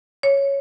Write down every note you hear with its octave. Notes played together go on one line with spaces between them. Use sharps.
C#5